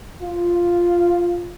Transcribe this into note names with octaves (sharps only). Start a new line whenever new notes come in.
F4